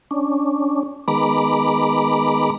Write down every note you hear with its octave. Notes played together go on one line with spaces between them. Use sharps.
C#4 D4
D#3 G#3 B3 A#5 B5 D6